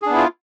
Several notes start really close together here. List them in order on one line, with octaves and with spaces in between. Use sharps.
G#4 D4 B3 E4 F4